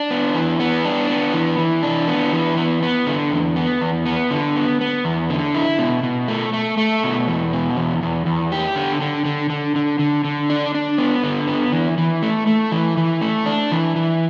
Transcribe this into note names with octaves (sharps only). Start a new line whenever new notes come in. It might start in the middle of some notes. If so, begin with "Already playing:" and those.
Already playing: D4
B3
E3
B3
D4
B3
E3
E3
D4
B3
E3
B3
B3
D3
E2
B3
E2
B3
D3
B3
B3
E2
D3
E4
B2
B2
A3
A3
A3
B2
E2
B2
E2
E2
E2
G4
D3
D3
D3
D3
D3
D3
D3
D4
D4
B3
D3
B3
E3
E3
A3
A3
E3
E3
A3
D4
E3
E3